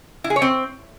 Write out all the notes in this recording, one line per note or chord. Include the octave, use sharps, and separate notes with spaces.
E4
G#4
C#5
C4